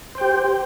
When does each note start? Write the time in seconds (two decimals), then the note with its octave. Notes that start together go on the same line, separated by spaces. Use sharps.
0.15 C5
0.18 G5
0.21 G4